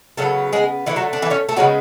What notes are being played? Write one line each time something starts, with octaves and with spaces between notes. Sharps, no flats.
C#3 F#3 A3 B3 A4
G#3 G#4
D3 E3 A3 E4
F#3 F#4
D4
E3 E4
C#4 C#5
A3 A4
C#3 F#3 G#3 B3 F#4